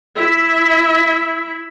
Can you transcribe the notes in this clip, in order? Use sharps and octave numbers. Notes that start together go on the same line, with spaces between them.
E4 E5